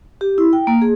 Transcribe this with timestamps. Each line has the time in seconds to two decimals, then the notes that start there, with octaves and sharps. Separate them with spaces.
0.21 G4
0.38 E4
0.53 G5
0.67 A#3
0.82 G#4